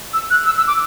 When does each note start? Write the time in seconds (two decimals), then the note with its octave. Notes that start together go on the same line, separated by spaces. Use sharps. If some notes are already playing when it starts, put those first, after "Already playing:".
0.13 E6
0.30 F#6
0.46 E6
0.57 E6
0.67 D6